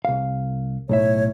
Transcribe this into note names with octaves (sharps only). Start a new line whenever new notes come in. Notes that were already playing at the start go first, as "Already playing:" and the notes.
C2 F5
B1 A2 C#5 E5